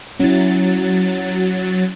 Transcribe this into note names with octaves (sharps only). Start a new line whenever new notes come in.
F#3 C#4 E4 A6